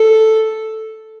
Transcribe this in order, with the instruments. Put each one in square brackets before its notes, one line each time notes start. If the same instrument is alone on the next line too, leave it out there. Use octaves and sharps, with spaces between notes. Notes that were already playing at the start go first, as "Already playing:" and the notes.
Already playing: [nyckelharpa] A4